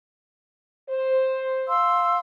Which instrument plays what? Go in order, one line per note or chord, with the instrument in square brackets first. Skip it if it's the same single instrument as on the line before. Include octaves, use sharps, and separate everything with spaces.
[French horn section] C5
[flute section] F5 C6 E6